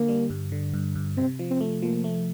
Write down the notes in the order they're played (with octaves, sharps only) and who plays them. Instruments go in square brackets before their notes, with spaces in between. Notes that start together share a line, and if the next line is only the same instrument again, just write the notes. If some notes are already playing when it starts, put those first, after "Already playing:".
Already playing: [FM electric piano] D3 [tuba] A#3
[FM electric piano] G3
G2
D3
G2
G2
[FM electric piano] C3 [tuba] C4
[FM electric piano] F3
[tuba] C4
[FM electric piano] A3
[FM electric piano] F3 [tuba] A#3
[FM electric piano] A3